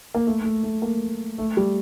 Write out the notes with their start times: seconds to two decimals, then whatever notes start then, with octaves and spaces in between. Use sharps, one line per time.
0.15 A#3
0.27 A3
0.45 A3
0.63 A3
0.82 A#3
1.38 A3
1.57 G3